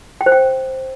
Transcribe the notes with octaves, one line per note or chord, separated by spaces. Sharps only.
G5
C5
G5